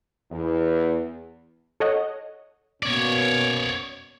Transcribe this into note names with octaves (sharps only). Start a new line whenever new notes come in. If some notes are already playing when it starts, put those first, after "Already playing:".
E2
A4 C#5 D#5 F#5
B2 A#3 C#4 C#5 D5